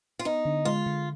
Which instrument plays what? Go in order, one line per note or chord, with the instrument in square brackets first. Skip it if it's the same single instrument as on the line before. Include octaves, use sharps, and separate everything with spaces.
[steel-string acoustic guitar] F4
[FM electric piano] B3 [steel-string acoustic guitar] D#4
[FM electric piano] D3
[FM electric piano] G#3 [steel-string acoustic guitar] F4
[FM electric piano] D3